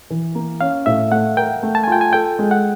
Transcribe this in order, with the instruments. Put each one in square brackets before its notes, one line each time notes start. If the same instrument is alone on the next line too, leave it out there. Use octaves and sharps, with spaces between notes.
[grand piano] E3
A#3
[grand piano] C#4 [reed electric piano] F5
[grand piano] A2 [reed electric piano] E5
[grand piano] A3 [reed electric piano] F#5
[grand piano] A#4 [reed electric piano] G5
[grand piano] A3
[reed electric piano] A5
G#5
[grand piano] F4 [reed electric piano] G5
[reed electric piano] G#5
[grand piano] A4 [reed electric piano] G5
[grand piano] G#3
[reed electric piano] F#5